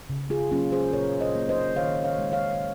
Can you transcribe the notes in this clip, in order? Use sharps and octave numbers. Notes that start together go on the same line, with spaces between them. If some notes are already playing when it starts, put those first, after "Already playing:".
C#3
F4 G#4
F#3 A#3 C#4 F4
G#4 C5
A#2 A#4 C#5
C5 D#5
F#3 A#3
C5 D#5
D#3 C#5 F5
C#5 F5
G#3
C#5 F5